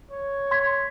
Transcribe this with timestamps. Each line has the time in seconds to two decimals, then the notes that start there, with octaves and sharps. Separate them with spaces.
0.11 C#5
0.51 C6 G#6 B6